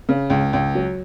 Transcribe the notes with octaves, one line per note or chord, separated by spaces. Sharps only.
C#3
C#2
C#2
F#3